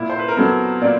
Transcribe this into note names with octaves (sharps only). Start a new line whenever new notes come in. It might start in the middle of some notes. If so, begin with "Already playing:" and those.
Already playing: A#2 E4
C5
B4
A#4
F#3 B3 A4
A#2 D5